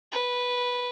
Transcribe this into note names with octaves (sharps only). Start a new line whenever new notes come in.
B4